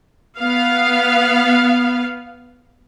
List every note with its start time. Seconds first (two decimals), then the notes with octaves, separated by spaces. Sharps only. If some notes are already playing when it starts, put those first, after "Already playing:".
0.39 B3 F5